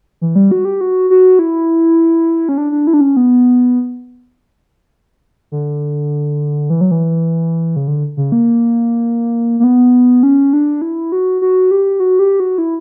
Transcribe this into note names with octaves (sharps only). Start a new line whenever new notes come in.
E3
G3
F#4
G4
F#4
F#4
E4
C#4
D4
D4
E4
D4
C#4
B3
D3
E3
F#3
E3
C#3
D3
C#3
A#3
A#3
B3
C#4
D4
E4
F#4
F#4
G4
F#4
G4
F#4
E4